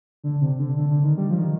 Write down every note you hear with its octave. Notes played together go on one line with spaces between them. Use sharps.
D3
C3
D3
D3
D3
D#3
G3
F3
D#3